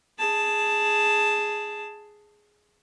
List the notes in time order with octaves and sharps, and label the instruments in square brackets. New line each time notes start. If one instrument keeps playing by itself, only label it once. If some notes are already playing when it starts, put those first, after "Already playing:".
[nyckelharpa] G#4 A5